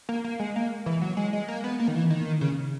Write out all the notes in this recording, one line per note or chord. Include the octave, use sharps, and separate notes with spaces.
A#3
A#3
G#3
A#3
E3
F#3
G#3
G#3
A#3
B3
A#3
D#3
E3
D#3
C#3